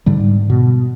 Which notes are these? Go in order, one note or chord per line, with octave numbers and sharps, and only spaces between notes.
G#2 D3 G3
B2